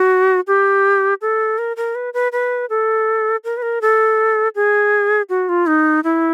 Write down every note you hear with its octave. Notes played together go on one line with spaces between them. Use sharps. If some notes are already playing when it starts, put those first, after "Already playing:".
Already playing: F#4
G4
A4
A#4
A#4
B4
B4
B4
A4
A#4
B4
A#4
A4
G#4
F#4
F4
D#4
E4